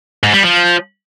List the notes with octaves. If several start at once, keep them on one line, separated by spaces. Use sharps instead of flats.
G#2
G3
F3